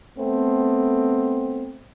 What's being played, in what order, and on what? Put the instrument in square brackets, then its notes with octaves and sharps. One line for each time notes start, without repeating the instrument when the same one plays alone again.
[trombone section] A3 B3 C4